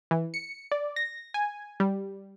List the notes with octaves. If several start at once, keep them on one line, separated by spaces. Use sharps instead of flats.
E3
C#7
D5
A#6
G#5
G3